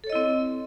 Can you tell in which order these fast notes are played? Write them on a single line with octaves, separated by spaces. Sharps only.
A4 C#5 D#5 E4 C4